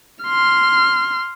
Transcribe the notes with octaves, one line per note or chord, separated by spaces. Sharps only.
C6 F6